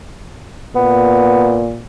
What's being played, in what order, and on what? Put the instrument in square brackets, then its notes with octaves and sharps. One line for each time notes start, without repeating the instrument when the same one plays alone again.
[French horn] A#2 [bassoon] B3